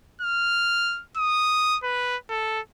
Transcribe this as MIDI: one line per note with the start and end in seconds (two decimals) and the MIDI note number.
0.22 1.02 89
1.17 1.77 87
1.84 2.16 71
2.30 2.60 69